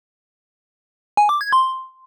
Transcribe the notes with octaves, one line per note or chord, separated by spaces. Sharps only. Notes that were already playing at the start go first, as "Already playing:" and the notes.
G#5
D6
G#6
C6